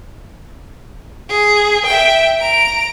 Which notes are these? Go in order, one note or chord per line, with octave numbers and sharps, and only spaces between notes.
G#4
E5 G5
A#5 D7